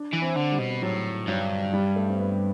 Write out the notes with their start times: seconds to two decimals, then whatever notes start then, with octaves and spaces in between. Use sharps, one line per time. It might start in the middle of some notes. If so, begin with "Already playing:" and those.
Already playing: D4
0.13 E3
0.22 C4
0.37 D3
0.52 G3
0.59 B2
0.82 A2 F#3
1.27 G2 F#3
1.73 G3
1.96 A3
2.09 C4
2.19 B3